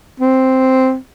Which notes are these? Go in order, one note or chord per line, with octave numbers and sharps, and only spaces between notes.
C4